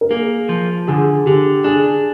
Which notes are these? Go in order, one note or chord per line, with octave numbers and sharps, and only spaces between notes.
A#4
A#3 G#4
F3
D3 G#4
D3 G4
D4 G#4